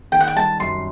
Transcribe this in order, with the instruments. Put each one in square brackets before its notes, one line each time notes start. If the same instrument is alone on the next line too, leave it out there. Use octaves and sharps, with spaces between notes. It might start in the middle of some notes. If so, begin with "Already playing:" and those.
[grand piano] D#3 [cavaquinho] G5
[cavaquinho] F#5
G5
[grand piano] G3 [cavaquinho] A5
[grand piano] F#2 [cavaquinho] C6